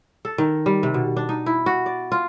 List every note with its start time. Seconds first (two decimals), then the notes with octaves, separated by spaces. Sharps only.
0.25 A4
0.38 D#3
0.66 G3
0.83 C3
0.94 B2
1.17 D4
1.29 D#4
1.46 E4
1.66 F#4
1.86 D5
2.12 F4